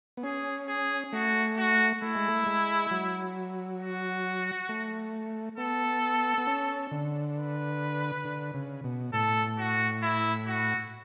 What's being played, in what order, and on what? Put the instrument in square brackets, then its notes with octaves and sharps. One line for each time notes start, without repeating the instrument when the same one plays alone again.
[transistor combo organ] B3
[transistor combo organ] C#4 [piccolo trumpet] G#4
[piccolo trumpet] G#4
[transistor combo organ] A3 [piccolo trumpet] F#4
[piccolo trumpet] F#4
[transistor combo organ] A3 [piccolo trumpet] E4
[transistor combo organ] G#3
A3
G#3
F#3
[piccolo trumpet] F#4
[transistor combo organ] A3
[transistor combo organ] B3 [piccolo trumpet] A4
[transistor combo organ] B3
C#4
D3
[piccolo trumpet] B4
[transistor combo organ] D3
C#3
B2
[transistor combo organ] A2 [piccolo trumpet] A4
[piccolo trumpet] F#4
E4
F#4